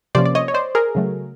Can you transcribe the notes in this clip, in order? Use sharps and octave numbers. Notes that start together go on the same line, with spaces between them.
C3 F3 A#3 C#4 C5 D5
D5
C#5 D#5
C#5
C5 D5
G#4 A#4
C#3 F#3 A3